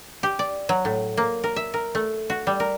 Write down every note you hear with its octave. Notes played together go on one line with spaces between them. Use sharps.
G4
D5
F#3
A2
A#3
A#4
E5
A#4
A3
F#4
G3
A#4